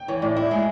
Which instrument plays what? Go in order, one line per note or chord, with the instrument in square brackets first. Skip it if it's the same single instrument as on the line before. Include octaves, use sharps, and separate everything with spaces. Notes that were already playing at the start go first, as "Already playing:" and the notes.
Already playing: [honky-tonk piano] G5
[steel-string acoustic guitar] E3 [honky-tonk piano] C#5
[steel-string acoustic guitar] A2 [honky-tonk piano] D5
[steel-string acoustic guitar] E4 [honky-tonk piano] D5
[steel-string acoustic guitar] G#3 [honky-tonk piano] G#5